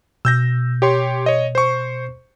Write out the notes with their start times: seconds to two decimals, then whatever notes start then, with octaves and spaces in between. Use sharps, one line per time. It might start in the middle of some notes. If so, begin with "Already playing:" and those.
0.25 B2 E6 G6 A#6
0.82 G4 C#5 C6
1.26 C#5 D#5
1.55 C5 C#6